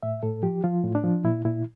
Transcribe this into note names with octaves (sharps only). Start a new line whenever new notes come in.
A2 E5
A2 A4
F3 G4
F3 F4
A2
D4
F3
A#2 E4
A#2 E4